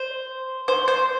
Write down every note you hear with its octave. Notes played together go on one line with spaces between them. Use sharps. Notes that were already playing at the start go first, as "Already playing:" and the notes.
Already playing: C5
C5
C5